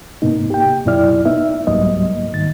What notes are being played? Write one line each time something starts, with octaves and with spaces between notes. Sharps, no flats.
G#2 C3 A#3 B3 D#4
G4 G5
F#2 B2 F#3 E4 D5 F6
B3 D#4 E5
C2 G#2 F#3 G3 A#3 D#5
G#2 D#3 A6